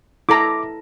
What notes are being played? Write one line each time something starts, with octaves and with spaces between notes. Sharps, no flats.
E4 A4 A#5 D6